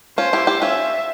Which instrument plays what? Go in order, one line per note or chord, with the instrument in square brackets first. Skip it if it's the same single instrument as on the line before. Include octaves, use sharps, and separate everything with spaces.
[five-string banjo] C#4 F4 [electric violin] C5
[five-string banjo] E4 G4
E4 G4
[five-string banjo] C#4 F4 [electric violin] E5